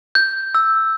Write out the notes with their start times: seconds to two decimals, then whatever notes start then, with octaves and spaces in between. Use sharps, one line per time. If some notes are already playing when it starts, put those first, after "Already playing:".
0.15 G6
0.55 E6